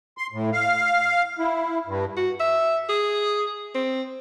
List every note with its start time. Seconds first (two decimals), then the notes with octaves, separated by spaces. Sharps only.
0.18 C6
0.32 A2
0.53 F5
1.39 E4
1.87 G2
2.16 F#4
2.40 E5
2.89 G#4
3.75 C4